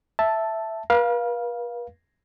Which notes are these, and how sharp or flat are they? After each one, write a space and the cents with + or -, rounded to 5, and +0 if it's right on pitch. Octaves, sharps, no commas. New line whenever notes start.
E5 +0 A5 +0
B4 -45 F5 +0